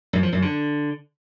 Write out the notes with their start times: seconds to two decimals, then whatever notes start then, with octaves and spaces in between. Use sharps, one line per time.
0.13 F#2
0.23 F3
0.32 F#2
0.42 D3